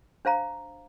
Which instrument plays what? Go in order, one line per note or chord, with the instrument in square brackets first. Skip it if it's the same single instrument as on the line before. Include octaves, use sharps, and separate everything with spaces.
[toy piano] D4 C5 F5 A#5